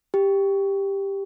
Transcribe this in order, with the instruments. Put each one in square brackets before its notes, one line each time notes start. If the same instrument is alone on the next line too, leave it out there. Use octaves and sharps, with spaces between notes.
[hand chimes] G4